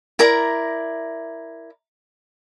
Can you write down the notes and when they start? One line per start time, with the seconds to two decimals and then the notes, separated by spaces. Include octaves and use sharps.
0.19 E4 A#4 D5 A#5